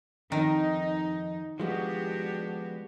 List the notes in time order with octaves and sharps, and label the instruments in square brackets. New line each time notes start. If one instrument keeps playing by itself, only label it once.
[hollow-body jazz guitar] F2 [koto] D#3 [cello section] D#4
[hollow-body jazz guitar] F3 G#3 B3 [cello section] D4 F#4 G4